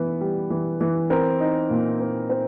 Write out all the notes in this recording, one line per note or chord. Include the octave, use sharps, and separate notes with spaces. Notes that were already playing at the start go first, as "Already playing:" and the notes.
Already playing: E3 B3 B4
G3
E3
E3
C4 A#4
D#4
A#2
C4
C4 C5